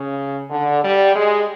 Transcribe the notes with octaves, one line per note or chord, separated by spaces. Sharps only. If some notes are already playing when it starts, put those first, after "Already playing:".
Already playing: C#3
D3
G3
G#3